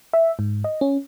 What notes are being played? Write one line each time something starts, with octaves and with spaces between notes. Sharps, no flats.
E5
G#2
D#5
C#4